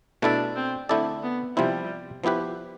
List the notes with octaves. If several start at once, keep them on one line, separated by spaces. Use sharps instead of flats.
B2 A3 D4 E4 A4 E5
C4
D3 A3 C4 E4 A4 D5
B3
C3 F3 G3 C4 E4
F3 B3 E4 G4 B4